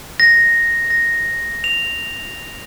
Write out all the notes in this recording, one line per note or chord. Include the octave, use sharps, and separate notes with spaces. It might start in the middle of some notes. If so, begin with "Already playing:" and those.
A#6
A#6
F7